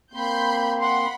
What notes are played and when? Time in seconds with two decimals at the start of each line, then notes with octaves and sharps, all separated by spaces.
0.13 A#3 C4 B5 C6 G6
0.81 F#5 B5 C6